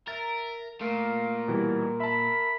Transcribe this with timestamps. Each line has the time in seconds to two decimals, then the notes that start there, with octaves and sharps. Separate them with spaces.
0.08 A#4 E5 A6
0.81 A#2 A3 A#4 F5
1.48 B2 E3 G3 E4
2.00 E5 A5 B5